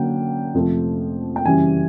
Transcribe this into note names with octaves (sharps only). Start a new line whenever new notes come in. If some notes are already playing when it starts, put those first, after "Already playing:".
Already playing: D3 F#3 A#3 C#4 F#5 G5
F2 C3 F3 A3
G5
F#2 C#3 E3 G3 G#5